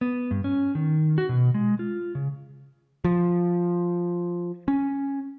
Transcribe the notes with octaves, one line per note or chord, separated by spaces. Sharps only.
B3
G2
C#4
D#3
F#4
B2
G#3
F4
C#3
F3
C#4